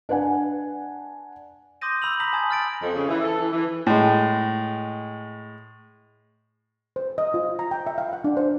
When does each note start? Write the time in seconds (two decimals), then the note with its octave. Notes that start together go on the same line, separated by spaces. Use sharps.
0.09 D4 B4 F#5 G#5
1.81 C6 D6 D#6 G6 A#6 D#7
2.02 B5 E6 F7 F#7
2.20 A#5 B5 D#6 A#6 B6 F#7
2.33 G#5 A5 D#6 G#6
2.50 F6 A6 D7
2.82 F2
2.94 C#3
3.08 E3
3.21 A4
3.38 E3
3.51 E3
3.87 A2 G#3
6.96 C5
7.18 D#5
7.34 F4
7.59 A#5
7.71 G5
7.87 E5
7.98 F5
8.13 F#5
8.24 D4
8.37 C5